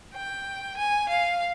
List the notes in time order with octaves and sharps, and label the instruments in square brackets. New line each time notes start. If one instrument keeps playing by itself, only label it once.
[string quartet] G5
G#5
F5